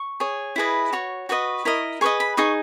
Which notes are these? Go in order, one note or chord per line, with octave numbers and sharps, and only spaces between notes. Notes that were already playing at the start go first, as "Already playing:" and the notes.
Already playing: C#6
G#4 C#5
E4 G#4 B4 D#5
F#4 C#5
F#4 B4 D#5 C#6
E4 A#4 D#5
G#4 B4 D#5 C#6
B5
D#4 G#4 D#5 C#6